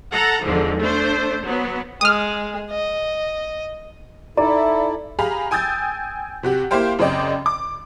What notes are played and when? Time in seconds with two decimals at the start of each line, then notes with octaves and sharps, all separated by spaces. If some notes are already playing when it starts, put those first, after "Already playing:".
0.12 A4 F#5 A#5
0.45 E2 G#2 D3 F3
0.79 A3 D4 C5
1.45 F#3 B3
2.01 G#3 D#6 F6
2.70 D#5
4.37 D#4 E4 A4 D5 E5 A#5
5.19 G4 G#4 F5 A#5 B5
5.51 G5 G#5 D#6 E6 G6 A6
6.43 C3 F#4 G4
6.71 A#3 E4 G4 C5 F5 G5
6.99 F#2 C#3 C4 D5 D#5 G5
7.46 D6